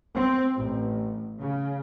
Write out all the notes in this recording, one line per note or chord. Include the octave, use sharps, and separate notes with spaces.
C4
A1
C#3